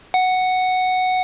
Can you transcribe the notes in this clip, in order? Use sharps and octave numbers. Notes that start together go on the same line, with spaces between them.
F#5